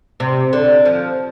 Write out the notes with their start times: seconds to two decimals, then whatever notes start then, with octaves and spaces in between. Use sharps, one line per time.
0.20 C3
0.53 D3
0.85 F3